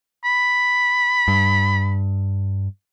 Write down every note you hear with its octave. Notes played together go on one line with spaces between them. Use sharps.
B5
G2